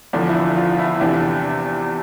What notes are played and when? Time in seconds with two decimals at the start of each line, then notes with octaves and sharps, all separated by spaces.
0.13 E2 D3 F3 D4
0.28 E4
0.35 D4
0.57 F4
0.79 E4
1.00 E2 C3 E3 D4